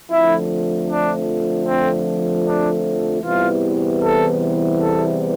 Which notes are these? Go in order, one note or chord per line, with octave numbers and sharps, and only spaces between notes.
F2 D3 F3 A3 E4
D4
C4
D4
E2 C3 E3 G3 B3 F4
A4
A4